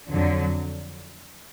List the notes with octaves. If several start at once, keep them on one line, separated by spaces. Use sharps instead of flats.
F2 D3 F#3